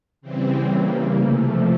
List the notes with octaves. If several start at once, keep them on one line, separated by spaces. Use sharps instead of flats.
C#3 E3 G3 C4
C#3 E3 G3 A#3
C3 F3 A3